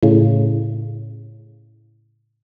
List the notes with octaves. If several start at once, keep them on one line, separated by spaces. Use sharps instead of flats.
A2 C#3